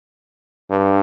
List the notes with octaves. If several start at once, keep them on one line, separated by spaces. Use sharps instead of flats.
G2